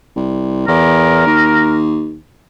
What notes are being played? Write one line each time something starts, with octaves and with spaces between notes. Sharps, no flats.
C2
E2 A#4
D#2